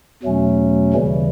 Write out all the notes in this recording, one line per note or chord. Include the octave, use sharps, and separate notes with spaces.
E2 B2 F#3 A3 C#4
D#2 C#3 E3 G3